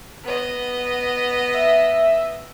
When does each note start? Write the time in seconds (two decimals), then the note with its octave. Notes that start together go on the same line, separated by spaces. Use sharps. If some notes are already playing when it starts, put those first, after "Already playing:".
0.24 B3 D#5
1.54 E5